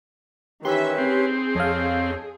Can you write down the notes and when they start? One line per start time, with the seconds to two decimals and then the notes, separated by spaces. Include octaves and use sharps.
0.65 D#3 E3 C#4 G4 B4 E5 C6
0.98 C4 G#4
1.55 F2 A4 C#5 D#5 F5